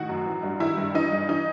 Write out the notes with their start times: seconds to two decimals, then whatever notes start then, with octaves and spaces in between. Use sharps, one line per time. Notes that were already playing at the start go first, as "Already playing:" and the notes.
Already playing: A2 D#3 F#4
0.09 F#2
0.26 E3
0.43 G2
0.60 D#3 E4
0.77 G2
0.94 E3 D#4
1.12 G2
1.29 E3 D#4